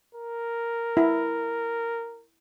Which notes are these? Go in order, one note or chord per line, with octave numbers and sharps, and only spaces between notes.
A#4
E4